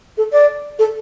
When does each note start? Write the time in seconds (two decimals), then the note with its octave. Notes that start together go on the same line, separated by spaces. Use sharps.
0.18 A4
0.32 D5
0.79 A4